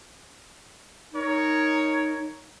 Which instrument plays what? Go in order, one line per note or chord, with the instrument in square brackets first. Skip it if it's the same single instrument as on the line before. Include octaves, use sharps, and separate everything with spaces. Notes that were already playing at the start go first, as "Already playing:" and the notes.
[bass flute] D#4 [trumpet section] A#4 C#5